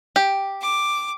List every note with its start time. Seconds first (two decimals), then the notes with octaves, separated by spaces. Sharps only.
0.16 G4
0.62 D6